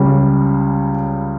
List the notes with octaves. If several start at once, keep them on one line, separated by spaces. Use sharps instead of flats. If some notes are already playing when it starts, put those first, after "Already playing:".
Already playing: C#2 C#3 G3